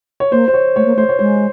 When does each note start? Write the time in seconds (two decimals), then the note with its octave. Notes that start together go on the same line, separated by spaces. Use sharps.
0.20 C#5
0.32 A#3 C5
0.48 C5
0.54 C#5
0.76 A3 C#5
0.85 A#3
0.96 A3 C5
1.09 C#5
1.19 G#3 C5